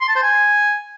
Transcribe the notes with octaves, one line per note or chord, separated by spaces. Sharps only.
C6
A5
C5
G#5